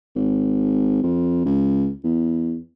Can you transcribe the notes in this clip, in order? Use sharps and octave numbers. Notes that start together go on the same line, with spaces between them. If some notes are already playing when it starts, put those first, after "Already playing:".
G#1
F2
C#2
E2